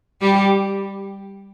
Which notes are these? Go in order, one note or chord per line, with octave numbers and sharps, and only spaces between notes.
G3 G4